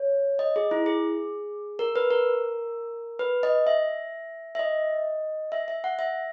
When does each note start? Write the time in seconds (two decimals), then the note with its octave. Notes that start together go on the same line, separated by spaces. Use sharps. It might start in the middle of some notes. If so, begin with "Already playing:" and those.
Already playing: C#5
0.39 D#5
0.56 G#4
0.71 E4
0.86 G#4
1.79 A#4
1.96 B4
2.11 A#4
3.19 B4
3.43 D#5
3.67 E5
4.55 E5
4.59 D#5
5.52 E5
5.68 E5
5.84 F#5
5.99 E5